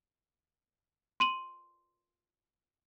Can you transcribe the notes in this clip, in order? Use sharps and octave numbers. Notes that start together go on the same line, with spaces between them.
C6 D#7 F#7